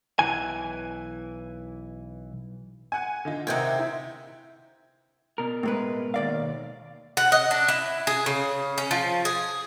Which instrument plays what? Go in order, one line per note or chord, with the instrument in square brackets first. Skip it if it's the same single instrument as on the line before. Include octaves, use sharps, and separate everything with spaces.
[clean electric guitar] B1 E3 G#5
[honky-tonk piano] F#5 G#5
D3 D#4 F4
[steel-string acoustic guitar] C3 D#3 C4 [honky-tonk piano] F#5 G6 G#6
[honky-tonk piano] E4
[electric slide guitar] B2 A#4
[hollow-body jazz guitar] A2 G#3 B4
D#2 D5 F5
[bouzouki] F#5
D#5
D4
E4
G#4
C#3
C#4
F3
G#4